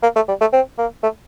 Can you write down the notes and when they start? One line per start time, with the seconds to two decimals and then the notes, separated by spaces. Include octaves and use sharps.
0.03 A#3
0.16 A3
0.28 G3
0.41 A3
0.53 C4
0.78 A#3
1.03 A3